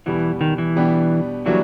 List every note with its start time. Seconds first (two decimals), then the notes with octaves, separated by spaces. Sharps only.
0.06 E2 B2 E3 G3 B3
0.41 D#3
0.58 E3
0.76 B2 G3 B3 D4 G4
1.46 E3 F#3 G3 A#3 D4 F#4